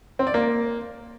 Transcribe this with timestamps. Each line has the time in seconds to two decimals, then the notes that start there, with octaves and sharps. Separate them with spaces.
0.19 C4
0.27 D5
0.34 A#3